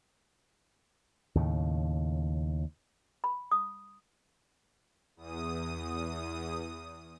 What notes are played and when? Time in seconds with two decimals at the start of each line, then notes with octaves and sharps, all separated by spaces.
1.35 D#2 A2 C#3
3.24 B5
3.51 D#6
5.16 E2 D#6